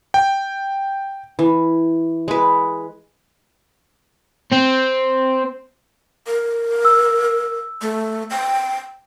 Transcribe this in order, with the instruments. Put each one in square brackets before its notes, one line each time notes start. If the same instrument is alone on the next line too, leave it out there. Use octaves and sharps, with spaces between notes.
[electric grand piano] G5
[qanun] E3
G#3 B4
[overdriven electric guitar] C4
[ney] A#4
[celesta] E6
[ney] A3
G5